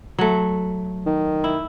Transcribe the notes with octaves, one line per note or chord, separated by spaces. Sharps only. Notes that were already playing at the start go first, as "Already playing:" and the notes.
F#3 A3
D#3
E4